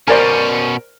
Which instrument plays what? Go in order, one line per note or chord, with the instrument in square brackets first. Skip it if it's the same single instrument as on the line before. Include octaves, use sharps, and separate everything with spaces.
[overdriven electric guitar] B2 C#4 [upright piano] A#4 [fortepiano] C5 D5 G#5